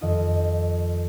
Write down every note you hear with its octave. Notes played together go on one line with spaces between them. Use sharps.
F2 D#3 F4 D#5